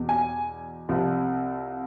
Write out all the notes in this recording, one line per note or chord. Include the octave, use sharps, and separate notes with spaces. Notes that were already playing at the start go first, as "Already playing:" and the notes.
Already playing: E2 B2
G#5
C2 C3 F3